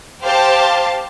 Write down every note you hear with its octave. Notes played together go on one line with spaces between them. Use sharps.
G4 C5 F5 A5